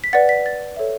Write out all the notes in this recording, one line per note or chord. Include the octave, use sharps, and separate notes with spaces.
B6
B4 D5 F#5 A6
B6
A6
A4 C#5 E5